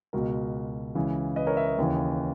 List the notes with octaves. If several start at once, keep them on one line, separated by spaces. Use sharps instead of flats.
C#2 B2 F#4 A#4
C#2 C#3 E3
B4 D#5
A#4 C#5
C#5 E5
B4 D#5
D#2 C#3 E3 B4 D#5